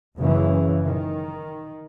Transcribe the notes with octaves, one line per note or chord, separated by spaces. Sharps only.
F#1 F#2 C#3 E3
D#3